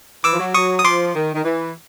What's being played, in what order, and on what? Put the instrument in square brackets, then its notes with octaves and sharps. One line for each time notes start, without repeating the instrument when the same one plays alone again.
[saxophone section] E3 [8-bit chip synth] D6 E6
[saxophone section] F3
F#3
[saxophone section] F#3 [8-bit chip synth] C#6 D#6
[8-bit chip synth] D#6
[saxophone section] F3 [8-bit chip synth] C6 D6
[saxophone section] D#3
D#3
E3